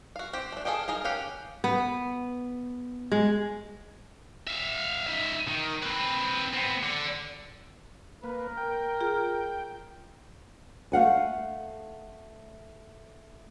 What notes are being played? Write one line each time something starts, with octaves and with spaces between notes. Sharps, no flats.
F#4 F5
C4 G4
A3 D4
G#4 A4 D#5 F5 G5
D#4 G#4 A#4 F5
C#4 G4 F5 F#5
B3
G#3
E5 F5
D#4 E5
D#3
C4 B4
B3 C4
D3
A#3 A#4 B4
G5
F4 G#4
A3 F5 F#5 G#5